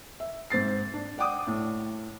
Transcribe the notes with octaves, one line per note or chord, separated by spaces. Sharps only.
E5
G#2 C4 A6 C7
D4
D5 F#5 G5 D6 D#6
A2